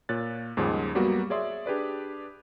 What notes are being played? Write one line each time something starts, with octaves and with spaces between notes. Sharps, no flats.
A#2 C#5 F#6 A6
D#2 G#2 C#3 F3 G3 G#3
F#3 G3 A#3 B3 F#4
G#4 C#5 D5 E5 C6 D#6
D4 G4 G#4 B4 D5